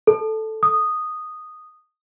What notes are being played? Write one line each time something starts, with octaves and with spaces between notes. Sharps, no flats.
A4
D#6